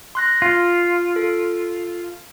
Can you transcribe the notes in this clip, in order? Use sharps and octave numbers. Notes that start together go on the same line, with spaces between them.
C6 F#6 A#6
F4 F5
A4